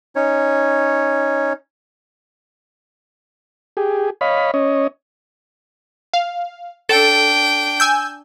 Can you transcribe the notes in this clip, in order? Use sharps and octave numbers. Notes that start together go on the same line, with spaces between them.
C#4 D#4 C#5
G4 G#4
C#5 D#5 F5 B5
C#4 C#5 D#5
F5
D4 A4 G5
G#5 E6 G6